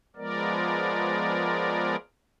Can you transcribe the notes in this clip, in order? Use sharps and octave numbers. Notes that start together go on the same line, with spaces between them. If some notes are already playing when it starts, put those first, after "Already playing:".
F3 G#3 B3 A#4 D5